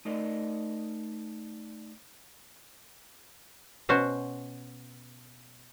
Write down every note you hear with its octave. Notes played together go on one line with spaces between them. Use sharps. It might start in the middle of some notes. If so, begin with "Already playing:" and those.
A3 D#4 A#4 D5 D#5
B2 C#4 F#4 C5